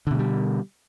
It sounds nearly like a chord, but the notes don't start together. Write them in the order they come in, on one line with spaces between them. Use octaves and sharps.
D3 B2 A3 G3